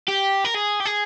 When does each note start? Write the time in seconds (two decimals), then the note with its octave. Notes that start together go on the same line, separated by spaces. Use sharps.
0.08 G4
0.45 A#4
0.55 G#4
0.80 G4
0.86 G#4